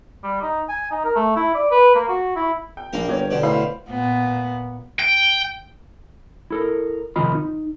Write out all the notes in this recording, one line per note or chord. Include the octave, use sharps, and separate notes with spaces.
G3
D#4
G#5
D#4
A#4
A3
E4
D5
B4
A#3
F#4
E4
G5
A#1 A#3 A#4
G1 G4 C#5
B2 D3
A2 C5 F5 B5
A#2 B3
G5
E4 A4 A#4
F2 C3 D#3 F4 D#5 B5
D#4